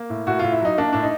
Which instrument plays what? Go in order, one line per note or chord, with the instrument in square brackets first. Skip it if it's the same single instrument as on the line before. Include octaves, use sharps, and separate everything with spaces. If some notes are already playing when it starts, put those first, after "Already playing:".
Already playing: [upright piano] A#3
A2
A2 F#4
A2 F4
E4
F#3 D#4
A#3 D4
A2 D4
D#4